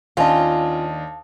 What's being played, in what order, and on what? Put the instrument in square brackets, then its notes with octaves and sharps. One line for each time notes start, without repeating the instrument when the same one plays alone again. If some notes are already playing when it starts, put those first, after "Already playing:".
[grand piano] D#2 D4 D#5 [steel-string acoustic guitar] C#4 F4 [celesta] F5 A5